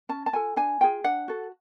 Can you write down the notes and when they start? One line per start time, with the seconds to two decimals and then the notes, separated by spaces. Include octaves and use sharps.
0.09 C#4 A5
0.26 A5
0.33 F4 A4 G#5
0.56 D4 G#5
0.81 F4 G#4 G5
1.04 D4 F#5
1.28 F#4 A4